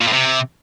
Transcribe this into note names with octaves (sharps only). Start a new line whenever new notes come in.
A#2
A2
C3